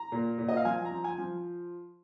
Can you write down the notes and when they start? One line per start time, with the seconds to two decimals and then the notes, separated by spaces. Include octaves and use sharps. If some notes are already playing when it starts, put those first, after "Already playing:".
Already playing: A#5
0.12 A#2
0.38 A#2
0.48 D#5
0.57 F5
0.65 F3 G#5
0.85 A#5
0.91 F3
1.04 G#5
1.18 F3